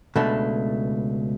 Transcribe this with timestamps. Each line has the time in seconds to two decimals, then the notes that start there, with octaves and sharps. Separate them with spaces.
0.16 C#2 B2 A3 D4